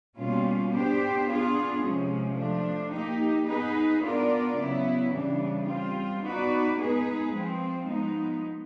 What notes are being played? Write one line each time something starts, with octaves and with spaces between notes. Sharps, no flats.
B2 G3 A#3 C#4 F4
B3 D4 G4 C5
B3 D4 F4 G#4
C3 F3 G#3 C#4
F3 A3 D4
A#3 D#4 G4
B3 D#4 G#4 B4
B3 D4 F4 A#4 D5
C#3 F#3 B3 E4
C#3 E3 G3 B3 D4
G3 C4 F4
B3 D#4 F#4 B4 D5
G#3 B3 D#4 G#4 B4
F3 G#3 C4
F3 G#3 B3 D#4